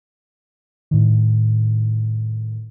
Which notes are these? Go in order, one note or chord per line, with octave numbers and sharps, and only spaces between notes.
A2 D#3